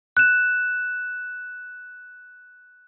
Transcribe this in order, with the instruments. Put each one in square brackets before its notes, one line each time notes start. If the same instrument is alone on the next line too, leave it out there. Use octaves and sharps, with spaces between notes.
[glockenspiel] F#6 E7